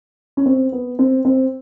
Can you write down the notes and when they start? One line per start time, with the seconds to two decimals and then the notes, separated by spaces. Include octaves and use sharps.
0.37 C#4
0.46 C4
0.72 B3
0.99 C4
1.25 C4